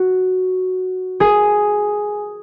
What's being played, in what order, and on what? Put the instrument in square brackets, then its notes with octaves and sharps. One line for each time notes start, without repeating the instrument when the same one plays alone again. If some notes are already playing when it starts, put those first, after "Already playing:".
Already playing: [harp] F#4
G#4